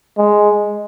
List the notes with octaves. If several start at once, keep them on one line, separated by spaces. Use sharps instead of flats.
G#3